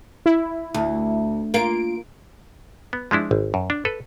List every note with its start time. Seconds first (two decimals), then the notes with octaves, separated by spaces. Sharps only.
0.26 E4
0.74 D2
1.54 A#3 F4 D7
2.93 B3
3.11 F3 G#3 D4 E4
3.31 G#1
3.54 F#2
3.70 D4
3.85 A4 B4